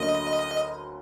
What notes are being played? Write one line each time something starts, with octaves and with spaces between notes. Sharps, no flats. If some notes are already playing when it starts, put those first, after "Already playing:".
Already playing: D2 D3 F#3 A#3 D#5